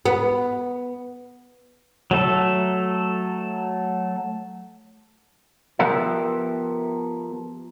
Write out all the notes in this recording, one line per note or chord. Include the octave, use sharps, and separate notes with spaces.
B3
F#3 A3 A4
F3 B3 G4 A4 A#4 E5